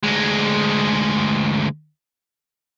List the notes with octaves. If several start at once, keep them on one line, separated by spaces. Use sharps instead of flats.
D2 G#3